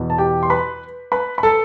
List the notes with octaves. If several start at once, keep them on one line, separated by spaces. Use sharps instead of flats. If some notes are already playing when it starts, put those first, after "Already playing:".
Already playing: E2 B2
A5
G4 G5
C6
B4 B5
B4 B5
B5
A4 A5